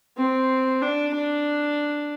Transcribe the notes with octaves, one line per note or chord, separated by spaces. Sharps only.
C4
D4
D4